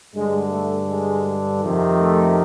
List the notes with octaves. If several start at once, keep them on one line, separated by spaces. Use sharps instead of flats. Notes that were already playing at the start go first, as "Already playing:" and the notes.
G2 D3 G#3
A3
G#3
F2 C3 D#3
A3